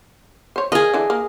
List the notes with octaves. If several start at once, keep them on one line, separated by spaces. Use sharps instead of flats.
C5 C#5
G#4 A#4 D#5 F5
D3 E3 D4
A#3